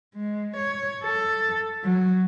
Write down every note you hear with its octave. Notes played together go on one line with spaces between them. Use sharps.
G#3
C#5
A4
F#3